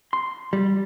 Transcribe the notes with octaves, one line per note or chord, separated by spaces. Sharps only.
C6
G3